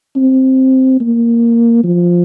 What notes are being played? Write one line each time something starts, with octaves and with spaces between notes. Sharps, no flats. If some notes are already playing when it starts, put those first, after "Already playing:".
C4
A#3
F3